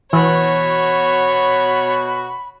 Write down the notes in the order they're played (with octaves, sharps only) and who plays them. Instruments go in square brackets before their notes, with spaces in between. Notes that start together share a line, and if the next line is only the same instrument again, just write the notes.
[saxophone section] B2 F#4 [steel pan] E3 [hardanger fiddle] C#5 [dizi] B5